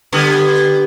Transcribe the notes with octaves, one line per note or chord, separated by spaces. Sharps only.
D3 G3 B3